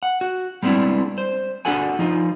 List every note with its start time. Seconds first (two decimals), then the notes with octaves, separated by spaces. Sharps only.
0.03 F#5
0.21 F#4
0.63 G3 G#3 B3 C4 D4 E4
1.18 C5
1.65 D4 F#4 G#4 A4 F#5 G#5
1.99 F3 D#4 F4